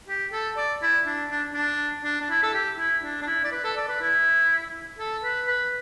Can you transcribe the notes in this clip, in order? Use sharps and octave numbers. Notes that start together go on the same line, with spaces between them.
G4
A4
D5
E4
D4
D4
D4
D4
D4
E4
A4
G4
E4
D4
D4
E4
D5
B4
A4
D5
B4
E4
A4
B4
B4